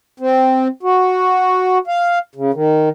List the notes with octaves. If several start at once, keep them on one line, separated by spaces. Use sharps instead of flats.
C4
F#4
F5
C#3
D#3